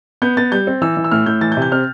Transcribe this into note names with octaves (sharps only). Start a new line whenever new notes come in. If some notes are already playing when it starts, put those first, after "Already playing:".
B3 G6
B3 A6
G3 G6
C4
E3 E6
E3
E6
A2 F6
A2 G6
E3 A6
G6
C3
G6
C4 F6